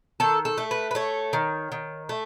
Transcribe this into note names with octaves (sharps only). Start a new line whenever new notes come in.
D#3 A4
A4
A3
B4
B4
A3 C#5
D#3
D#3
A3